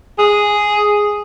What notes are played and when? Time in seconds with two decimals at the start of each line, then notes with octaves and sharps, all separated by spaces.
0.19 G#4